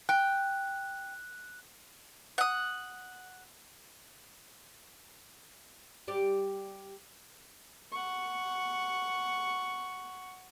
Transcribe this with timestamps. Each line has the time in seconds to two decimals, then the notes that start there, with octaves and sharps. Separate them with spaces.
0.09 G5 F#6
2.38 F#5 D#6
6.08 G3 G4 D5
7.92 F#5 C#6